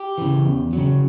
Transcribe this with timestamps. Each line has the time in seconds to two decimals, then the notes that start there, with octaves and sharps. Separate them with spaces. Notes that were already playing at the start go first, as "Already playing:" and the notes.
Already playing: G4
0.18 C#3 E3
0.45 E2
0.73 C#3 F#3